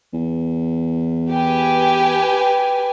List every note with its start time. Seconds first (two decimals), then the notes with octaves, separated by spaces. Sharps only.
0.13 E2
1.34 G4 B4 G#5